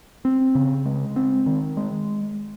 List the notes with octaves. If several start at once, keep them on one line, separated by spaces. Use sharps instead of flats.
C4
C#3
G#3
C4
D#3
G#3